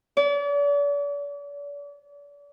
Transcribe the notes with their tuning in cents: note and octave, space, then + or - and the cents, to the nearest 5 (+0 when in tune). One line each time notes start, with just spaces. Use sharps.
D5 -40